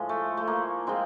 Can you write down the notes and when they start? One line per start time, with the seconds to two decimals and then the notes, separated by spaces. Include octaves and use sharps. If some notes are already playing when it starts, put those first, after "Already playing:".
Already playing: A2 F3 G#3
0.09 A3
0.37 A3
0.47 A#3
0.87 F3 G#3 C4